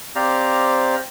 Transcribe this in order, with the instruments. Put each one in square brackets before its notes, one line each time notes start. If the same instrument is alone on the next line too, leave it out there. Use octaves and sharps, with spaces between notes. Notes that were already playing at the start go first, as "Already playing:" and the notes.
[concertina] C4 G4 C5 D5 F5 A#5